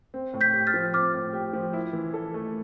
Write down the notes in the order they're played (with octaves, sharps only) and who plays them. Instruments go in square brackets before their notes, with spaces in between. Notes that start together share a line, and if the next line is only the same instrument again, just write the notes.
[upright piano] C4
A2
[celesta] G6 B6
[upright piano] G4
[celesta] F6 A6
[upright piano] F3
[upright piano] C4 [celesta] D6 F6
[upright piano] A2
G4
F3
E4
E3
A4
A3